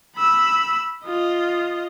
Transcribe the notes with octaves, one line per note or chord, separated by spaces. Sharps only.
B5 E6
F4 D#5